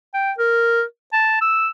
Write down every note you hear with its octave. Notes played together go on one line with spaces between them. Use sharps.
G5
A#4
A5
E6